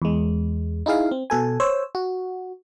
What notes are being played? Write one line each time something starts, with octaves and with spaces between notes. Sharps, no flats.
E2 G#3
D#4 E4 G#4 F5
C4
B2 A4 G#5
C5 C#5 E6
F#4